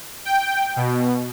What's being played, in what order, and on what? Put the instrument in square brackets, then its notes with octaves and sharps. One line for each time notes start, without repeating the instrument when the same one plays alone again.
[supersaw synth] G5
B2